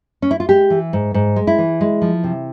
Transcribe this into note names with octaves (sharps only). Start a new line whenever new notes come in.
C#4
E4
F4
G#3 G4
E3
G#2
G#2
G#3
E4
E3
G#3
F3
C3